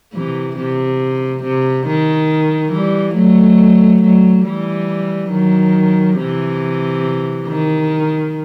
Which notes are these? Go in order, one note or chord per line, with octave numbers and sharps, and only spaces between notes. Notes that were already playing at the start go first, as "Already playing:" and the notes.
C3 E3
C3
C3
D#3
E3 G3
F#3 A3
F#3 A3
E3 G3
D#3 F#3
C3 E3
D#3